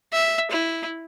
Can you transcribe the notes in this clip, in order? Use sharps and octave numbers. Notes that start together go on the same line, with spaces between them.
E5
E4